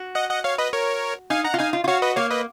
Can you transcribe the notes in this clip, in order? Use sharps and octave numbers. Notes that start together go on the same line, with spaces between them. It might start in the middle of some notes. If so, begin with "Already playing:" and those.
Already playing: F#4
D#5 F#5
D#5 F#5
C#5 F5
B4 D#5
A#4 C#5
D#4 F5 G#5
F#5 A#5
F4
D#4 F5 G#5
F4
F4
F#4 C#5 F5
B4 D#5
A#3 C#5 F5
B4 D#5